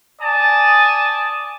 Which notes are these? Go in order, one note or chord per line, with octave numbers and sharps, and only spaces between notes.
D5 G#5 A5 D#6